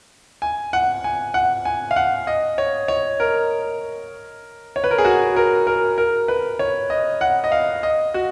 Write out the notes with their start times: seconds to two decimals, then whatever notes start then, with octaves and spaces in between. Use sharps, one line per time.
0.42 G#5
0.73 F#5
1.04 G#5
1.34 F#5
1.65 G#5
1.91 F5
1.96 F#5
2.27 D#5
2.58 C#5
2.88 C#5
3.20 A#4
4.76 C#5
4.84 B4
4.91 A#4
4.98 G#4
5.05 F#4
5.36 A#4
5.67 A#4
5.98 A#4
6.28 B4
6.59 C#5
6.90 D#5
7.21 F#5
7.44 D#5
7.52 F5
7.83 D#5
8.14 F#4